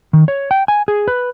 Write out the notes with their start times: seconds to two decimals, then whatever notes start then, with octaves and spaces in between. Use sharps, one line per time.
0.13 D#3
0.28 C#5
0.51 G5
0.68 G#5
0.88 G#4
1.08 B4